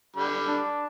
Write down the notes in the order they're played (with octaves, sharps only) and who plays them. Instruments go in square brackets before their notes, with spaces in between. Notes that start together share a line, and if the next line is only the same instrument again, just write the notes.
[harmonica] D3 G3 B5
[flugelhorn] D4